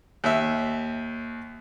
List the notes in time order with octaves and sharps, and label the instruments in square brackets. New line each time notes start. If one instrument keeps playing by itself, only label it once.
[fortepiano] D#2 E5